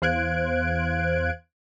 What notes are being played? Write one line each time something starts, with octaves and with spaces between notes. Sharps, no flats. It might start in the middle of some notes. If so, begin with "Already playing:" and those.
E2 C5 F5 F#6 G#6 D7